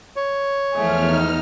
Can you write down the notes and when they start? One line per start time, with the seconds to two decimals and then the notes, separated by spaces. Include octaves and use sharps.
0.16 C#5
0.74 E2 F3 A3 G#4 F6
1.11 D#4